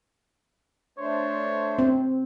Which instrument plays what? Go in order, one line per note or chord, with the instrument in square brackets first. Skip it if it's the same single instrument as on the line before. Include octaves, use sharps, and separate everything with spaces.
[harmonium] A3 D4 C5 [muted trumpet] C#5
[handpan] C4